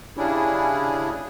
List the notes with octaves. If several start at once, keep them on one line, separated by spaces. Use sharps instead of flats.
C#3 G3 C#4 D4 E4 G#4